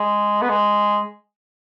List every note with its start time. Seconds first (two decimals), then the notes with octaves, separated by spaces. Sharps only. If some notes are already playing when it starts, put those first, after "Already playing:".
Already playing: G#3
0.42 B3
0.49 G#3